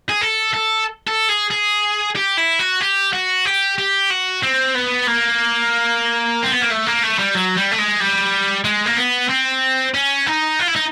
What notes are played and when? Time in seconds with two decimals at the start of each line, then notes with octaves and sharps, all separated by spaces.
0.10 G#4
0.21 A4
0.54 A4
1.08 A4
1.29 G#4
1.51 G#4
2.16 G4
2.38 E4
2.59 F#4
2.81 G4
3.13 F#4
3.45 G4
3.78 G4
4.10 F#4
4.43 C4
4.75 B3
5.08 A#3
6.43 C4
6.52 B3
6.61 A#3
6.70 A3
6.86 A#3
7.03 A3
7.19 G3
7.35 F#3
7.57 G3
7.71 A3
7.78 G#3
8.00 G3
8.65 G#3
8.86 A#3
8.97 B3
9.30 C4
9.94 C#4
10.27 D#4
10.59 F4
10.68 E4
10.75 D#4